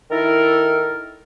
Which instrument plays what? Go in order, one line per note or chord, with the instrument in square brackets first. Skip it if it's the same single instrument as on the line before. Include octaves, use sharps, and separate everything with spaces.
[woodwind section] D#3 E4 A4 A#4